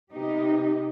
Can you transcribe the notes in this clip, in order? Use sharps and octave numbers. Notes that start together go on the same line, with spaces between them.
C3 B3 D#4 G4